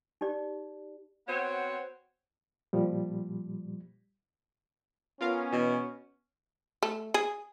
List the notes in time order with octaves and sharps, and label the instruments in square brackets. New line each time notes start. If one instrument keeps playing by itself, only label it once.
[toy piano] D#4 G4 D5
[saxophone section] B3 C4 F#4 C5 C#5
[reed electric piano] A#2 F3 G3
[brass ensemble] B3 C#4 [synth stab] F4 A#4 F5
[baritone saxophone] B2 [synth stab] E3
[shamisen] A3
G#4